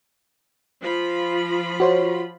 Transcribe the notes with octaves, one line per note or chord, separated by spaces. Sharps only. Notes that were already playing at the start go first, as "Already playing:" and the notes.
F3 F4 B5
F#4 C5 C#5